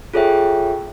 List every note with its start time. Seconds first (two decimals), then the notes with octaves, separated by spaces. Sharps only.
0.14 F4 G#4 A4 C#5 E5 G5